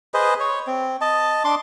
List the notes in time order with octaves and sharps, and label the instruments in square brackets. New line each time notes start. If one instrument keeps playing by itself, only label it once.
[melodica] G#4 B4 C5 D#5
C#5
C4
D#5 A5
D4 C6 D6